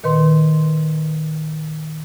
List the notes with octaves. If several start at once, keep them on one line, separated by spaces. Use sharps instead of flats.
A#2 D#3 B4 C6